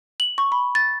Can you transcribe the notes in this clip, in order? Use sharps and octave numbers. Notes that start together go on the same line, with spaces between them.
F#7
C#6
B5
A6